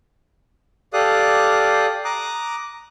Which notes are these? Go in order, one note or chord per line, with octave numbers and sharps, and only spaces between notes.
G4 A4 D5 F5 D#6 F#6
A#5 D6 D#6 F#6